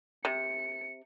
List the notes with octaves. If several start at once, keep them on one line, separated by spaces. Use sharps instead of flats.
C3 C#7